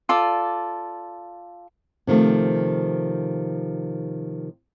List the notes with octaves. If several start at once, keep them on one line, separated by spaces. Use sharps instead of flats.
F4 A4 D5
C3 D#3 F3 A3